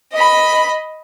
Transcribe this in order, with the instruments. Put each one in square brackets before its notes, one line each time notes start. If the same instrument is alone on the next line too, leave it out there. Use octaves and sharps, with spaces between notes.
[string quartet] D#5 B5